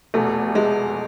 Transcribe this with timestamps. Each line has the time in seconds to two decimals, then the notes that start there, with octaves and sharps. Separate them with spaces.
0.14 F1 E2 B2 A3
0.55 G#3